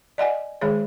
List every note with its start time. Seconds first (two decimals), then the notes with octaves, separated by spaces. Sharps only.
0.18 D5 D#5 F#5 G#5
0.61 D#3 G#3 G#4 C#5